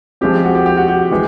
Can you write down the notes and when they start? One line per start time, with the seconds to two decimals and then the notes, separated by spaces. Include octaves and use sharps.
0.21 F3 G#3 C4 G4
0.44 F#4
0.55 G4
0.66 G4
0.77 F#4
0.88 G4
1.11 E3 G#3 G4